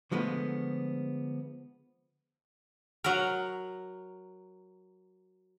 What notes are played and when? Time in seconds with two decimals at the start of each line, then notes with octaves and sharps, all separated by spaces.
0.11 D3 F3 G#3 A3 B3
3.04 F#3 A#4